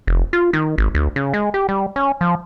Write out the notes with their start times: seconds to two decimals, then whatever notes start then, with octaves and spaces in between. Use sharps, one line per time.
0.07 F1
0.33 F4
0.53 D#3
0.78 G#1
0.95 D2
1.16 C#3
1.34 G#3
1.54 G4
1.69 G3
1.96 C#4
2.21 F3